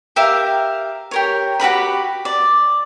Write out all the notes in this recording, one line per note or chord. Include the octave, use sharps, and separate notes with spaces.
G4 A#4 E5 F5
G4 A#4 C#5
F#4 G4 A#4 B5
D5